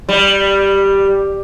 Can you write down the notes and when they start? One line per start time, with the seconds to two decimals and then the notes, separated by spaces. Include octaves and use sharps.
0.09 G3